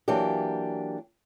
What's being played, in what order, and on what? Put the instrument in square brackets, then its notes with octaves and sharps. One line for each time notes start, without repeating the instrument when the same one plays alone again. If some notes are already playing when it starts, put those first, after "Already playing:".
[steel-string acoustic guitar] E3 F#3 A#3 D4 G4